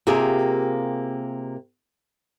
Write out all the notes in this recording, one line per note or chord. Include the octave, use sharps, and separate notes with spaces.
C3 A#3 F4 G4 G#4 A#4